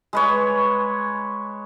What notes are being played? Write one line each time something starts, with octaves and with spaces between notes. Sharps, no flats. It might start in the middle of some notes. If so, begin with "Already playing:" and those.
G#3 B4 C#5